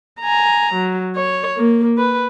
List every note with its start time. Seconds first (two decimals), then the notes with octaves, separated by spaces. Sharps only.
0.20 G#5 A#5
0.74 F#3
1.16 C#5
1.57 A#3
1.98 B4